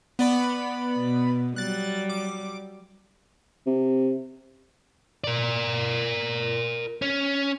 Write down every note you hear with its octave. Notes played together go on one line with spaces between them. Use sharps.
B3 D5 B5
B2
F#3 G3 F#6 A6
D6
C3
A#4 D5
C#4